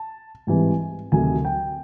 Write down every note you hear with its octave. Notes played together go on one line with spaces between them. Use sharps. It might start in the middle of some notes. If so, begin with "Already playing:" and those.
Already playing: A5
G#2 E3 G3 C4 G#5
D2 C3 D#3 F#3 A3 G#5
G5